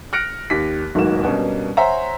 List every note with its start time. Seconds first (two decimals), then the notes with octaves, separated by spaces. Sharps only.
0.13 F6 F#6 A#6 C#7 D7
0.50 D#2 B6
0.95 D1 B1 G#2 D#3 A#3 E7
1.23 G2 B2 A#3 C#4
1.77 C5 C#5 E5 F#5 G#5 A#5